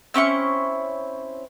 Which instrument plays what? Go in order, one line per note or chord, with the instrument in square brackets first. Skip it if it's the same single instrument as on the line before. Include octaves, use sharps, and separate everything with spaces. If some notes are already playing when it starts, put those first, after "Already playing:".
[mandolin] C4 C#4 E4 C#6